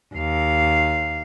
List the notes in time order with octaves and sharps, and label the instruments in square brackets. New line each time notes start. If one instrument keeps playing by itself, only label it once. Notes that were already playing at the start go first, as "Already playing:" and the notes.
[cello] D#2 F5